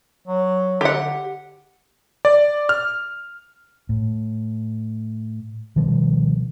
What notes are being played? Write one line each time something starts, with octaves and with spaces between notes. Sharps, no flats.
F#3
D3 G4 F#5
D5
F6
A2
B2 D#3 F3 G3